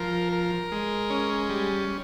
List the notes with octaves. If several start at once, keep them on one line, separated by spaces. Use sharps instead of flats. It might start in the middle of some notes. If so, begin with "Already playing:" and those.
Already playing: F3 A#4
A#4
G#3
C#4
G3